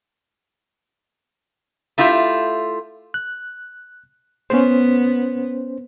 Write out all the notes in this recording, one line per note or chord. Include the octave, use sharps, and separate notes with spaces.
A3 E4 F4 G4
F#6
B3 C#4 C5